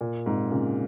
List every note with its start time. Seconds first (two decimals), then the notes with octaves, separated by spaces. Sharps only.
0.01 A#2
0.26 G#2 C3
0.51 A#2 C#3